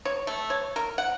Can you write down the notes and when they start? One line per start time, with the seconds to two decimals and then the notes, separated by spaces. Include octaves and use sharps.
0.05 C#5
0.27 A3
0.50 C#5
0.76 A#4
0.98 F#5